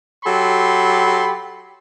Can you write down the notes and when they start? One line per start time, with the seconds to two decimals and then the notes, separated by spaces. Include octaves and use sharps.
0.25 F#3 G4 A4 B5 C6